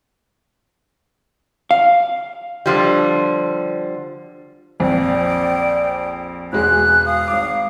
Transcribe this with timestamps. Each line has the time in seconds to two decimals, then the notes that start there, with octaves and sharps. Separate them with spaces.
1.71 F5
2.66 D3 F3 G3
4.80 A#1 F2 D5 G5
6.53 E1 G#3 F#6
7.06 F5 D#6
7.28 G#1 D6